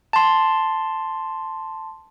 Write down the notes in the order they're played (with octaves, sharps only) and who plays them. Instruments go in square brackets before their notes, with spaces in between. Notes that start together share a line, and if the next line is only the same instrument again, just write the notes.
[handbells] A5 C6